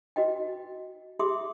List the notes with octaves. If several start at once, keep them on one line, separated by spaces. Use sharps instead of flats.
F#4 B4 D#5 G5
G4 G#4 E5 C6 D6 D#6